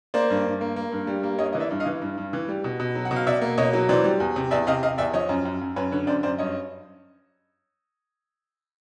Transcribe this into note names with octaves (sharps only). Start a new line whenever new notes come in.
A#3 C5 D5
G2
G2
A#3
A#3
G2
G3
A#3
G2 C#5 D#5
E3 D#5
D5 E5
G2
D#5 F5
E3
G2
G2
E3
G3
B2
B2
F#3
F#5
B2
F5
B2 D5 E5
A#3
B2 C#5 D#5
F#3
E3 C5 D5
G3
E2
C3
E2 D5 E5
C3 D#5 F5
C3 D#5 F5
E2 D5 E5
F3 C#5 D#5
F#2
F#2
F#2
F#2 B4 C#5
D3 B4 C#5
F#2 C5 D5
F#2 C5 D5
G2 C#5 D#5